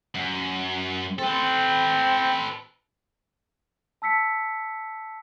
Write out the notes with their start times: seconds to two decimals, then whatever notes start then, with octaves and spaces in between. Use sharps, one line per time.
0.15 F#2
1.19 C4 A4 B4
4.02 A5 E6 B6 C#7